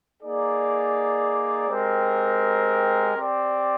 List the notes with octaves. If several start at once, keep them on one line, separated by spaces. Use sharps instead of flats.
A#3 D#4 G#4 D5
G#3 C4 G4 A#4
C4 G4 D5